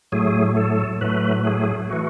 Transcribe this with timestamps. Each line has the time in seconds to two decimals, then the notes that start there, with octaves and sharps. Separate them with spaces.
0.12 A2 F#3 A3 G#4
0.56 A4
1.01 A2 F#3 A3 B4
1.45 G#4
1.90 E3 A3 F#4